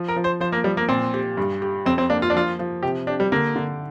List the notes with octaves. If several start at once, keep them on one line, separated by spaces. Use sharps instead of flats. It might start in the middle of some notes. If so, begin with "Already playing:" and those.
Already playing: F3
A#4
F3
C5
F3 C5
A#3
F3 G3
A#3
A#2 C4
G4
G2
G4
F2 C4
C4
A#3 D4
F4
D4
F3 F4
F3
C3 G4
D4 G4
G3
D3 A#3
D3